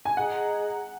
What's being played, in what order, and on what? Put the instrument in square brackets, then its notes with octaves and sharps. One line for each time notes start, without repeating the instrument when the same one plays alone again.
[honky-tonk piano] G#5
[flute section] G#4 D#5 A#5 [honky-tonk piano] F#5